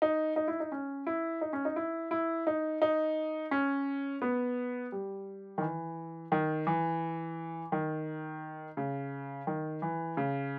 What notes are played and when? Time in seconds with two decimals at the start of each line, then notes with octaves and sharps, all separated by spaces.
0.02 D#4
0.36 D#4
0.48 E4
0.60 D#4
0.72 C#4
1.07 E4
1.41 D#4
1.53 C#4
1.65 D#4
1.76 E4
2.11 E4
2.47 D#4
2.82 D#4
3.51 C#4
4.22 B3
4.92 G3
5.58 D#3
5.61 E3
6.32 D#3
6.67 E3
7.72 D#3
8.77 C#3
9.47 D#3
9.82 E3
10.17 C#3